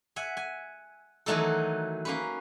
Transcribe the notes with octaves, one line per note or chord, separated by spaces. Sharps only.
E5 F#5 G#5
G#5
D#3 E3 F#3 A3 D#4 A4
A#3 C#4 B4